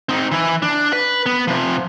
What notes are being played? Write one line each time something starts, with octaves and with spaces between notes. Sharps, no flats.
C4 D#4
E3 E4
D4
B4
B3
C3 F3